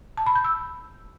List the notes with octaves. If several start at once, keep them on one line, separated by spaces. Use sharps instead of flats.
A5
B5
G6
E6